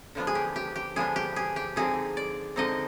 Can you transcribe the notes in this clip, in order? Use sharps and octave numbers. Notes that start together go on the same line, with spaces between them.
D3 F3 B3 D4
G#4
G4
G4
G4
D3 F3 B3 D4 G#4
G4
G#4
G4
D3 F3 C4 D#4 G#4
D5
D3 F3 C4 D#4 D#5